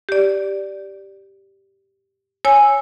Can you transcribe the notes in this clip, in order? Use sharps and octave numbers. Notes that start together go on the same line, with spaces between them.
G4 D5
C#5 G#5 E6